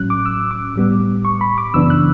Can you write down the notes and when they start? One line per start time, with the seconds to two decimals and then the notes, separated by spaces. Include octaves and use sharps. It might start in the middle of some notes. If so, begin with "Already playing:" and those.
Already playing: A2 F#3 C#4 F#6
0.10 D6
0.26 E6
0.51 D6
0.76 A2 G3 B3
1.25 C#6
1.41 B5
1.58 D6
1.74 F#2 C#3 E3 B3 D4 E6
1.90 F#6